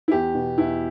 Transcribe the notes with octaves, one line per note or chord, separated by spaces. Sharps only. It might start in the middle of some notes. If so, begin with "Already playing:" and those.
E4
E2 G4
B2
E2 E4